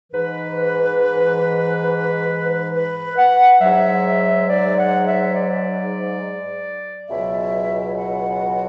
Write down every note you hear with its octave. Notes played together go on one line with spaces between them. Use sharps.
G#2 E3 B4
B4
F#5
G#2 F#3 E5
D5
F#5
E5
D5
C#2 B2 F#3 E5
F#5